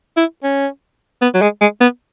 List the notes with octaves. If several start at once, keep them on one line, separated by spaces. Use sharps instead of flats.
E4
C#4
B3
F#3
G#3
G#3
B3